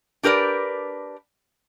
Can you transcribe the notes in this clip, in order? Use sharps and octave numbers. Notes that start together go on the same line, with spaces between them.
D4 G4 A#4 B4 D5